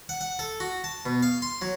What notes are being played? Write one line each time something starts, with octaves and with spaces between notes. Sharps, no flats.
F#5
F#5
A4
F#4
A5
B2
F5
C6
F#3